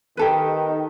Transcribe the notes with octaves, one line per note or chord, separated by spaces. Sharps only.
D#3 G4 A4 B4